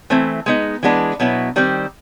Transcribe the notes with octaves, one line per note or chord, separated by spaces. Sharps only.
E3 A3 C4 E4
G#3 B3 D#4
E3 G#3 B3 D4
B2 F#3 B3 E4
D#3 G3 C4